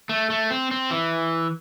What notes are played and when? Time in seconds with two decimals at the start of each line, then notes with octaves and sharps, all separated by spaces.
0.09 A3
0.30 A3
0.50 C4
0.71 C4
0.91 E3